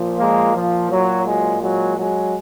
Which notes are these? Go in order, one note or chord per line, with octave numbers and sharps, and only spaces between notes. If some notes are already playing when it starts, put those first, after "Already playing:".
Already playing: A#2 F3
G#3 A#3
F3
F#3
F#3 G#3
F#3 G#3
F#3 G#3